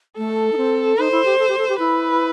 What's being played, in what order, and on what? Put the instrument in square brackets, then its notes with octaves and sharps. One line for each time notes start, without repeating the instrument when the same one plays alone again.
[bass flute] A3 [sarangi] A4
[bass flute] D#4
C4
[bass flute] D#4 [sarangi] C5
[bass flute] E4
G4
A4
G4
A4
G4
[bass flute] E4 [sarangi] B4